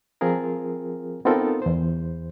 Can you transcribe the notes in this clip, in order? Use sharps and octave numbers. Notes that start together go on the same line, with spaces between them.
F3 C4 F4 G#4 A#4
B3 C4 D#4 F4 A4 A#4
E2 C5